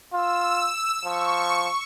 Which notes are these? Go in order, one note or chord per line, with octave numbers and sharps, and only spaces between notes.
F4 E6
F3 C#6